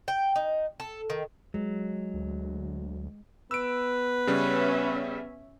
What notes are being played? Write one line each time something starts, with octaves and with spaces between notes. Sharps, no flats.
G5
D#4
A4
D#3
F#3 G#3
D2
B3 B4 E6 D7
C#3 G3 C#4 E5